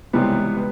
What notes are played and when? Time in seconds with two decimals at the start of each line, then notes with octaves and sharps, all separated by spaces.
0.13 C#2 C3 E3 G3 B3
0.57 B4